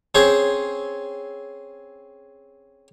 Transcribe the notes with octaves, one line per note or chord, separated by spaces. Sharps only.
C4 C#4 G#4 C5